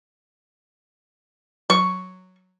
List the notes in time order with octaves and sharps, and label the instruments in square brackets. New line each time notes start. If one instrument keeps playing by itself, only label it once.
[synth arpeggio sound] F#3 [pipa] C#6